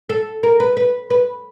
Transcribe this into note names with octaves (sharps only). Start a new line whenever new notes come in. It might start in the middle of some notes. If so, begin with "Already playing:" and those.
A4
A#4
B4
B4
B4